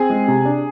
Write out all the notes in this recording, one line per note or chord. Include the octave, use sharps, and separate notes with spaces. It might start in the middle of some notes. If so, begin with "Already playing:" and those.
Already playing: C4 G#4 G#5
G#3
C3
D4